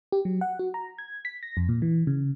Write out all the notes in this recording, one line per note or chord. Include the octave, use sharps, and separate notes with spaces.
G4
F#3
F#5
F#4
A#5
G#6
B6
A#6
F2
A#2
E3
C#3